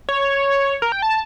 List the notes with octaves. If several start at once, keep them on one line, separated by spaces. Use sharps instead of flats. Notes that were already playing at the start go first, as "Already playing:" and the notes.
C#5
A#4
G5
A5